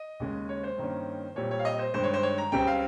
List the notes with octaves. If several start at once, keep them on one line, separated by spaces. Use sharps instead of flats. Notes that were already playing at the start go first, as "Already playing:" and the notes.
Already playing: D#5
D#2 C#3 G#3
C#5
C5
G2 D#3 A#3 C#4
A#2 G3 C4 C#5
C#5
F5
D#5
C5
G2 D#3 G#3 C5
C#5
C5
C#5
A#5
C#2 C#3 G3 C4 G5
F5